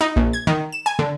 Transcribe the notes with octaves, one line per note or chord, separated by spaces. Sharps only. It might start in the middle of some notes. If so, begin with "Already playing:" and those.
D#4
A#1
G#6
D#3
E7
G#5
D3